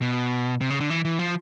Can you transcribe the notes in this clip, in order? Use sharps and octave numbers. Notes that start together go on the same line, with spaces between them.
B2
C3
C#3
D3
E3
E3
F3